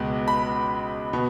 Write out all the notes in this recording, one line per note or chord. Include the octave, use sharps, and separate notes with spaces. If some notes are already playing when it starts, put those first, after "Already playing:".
Already playing: C#2 B2 G#3
B5
B2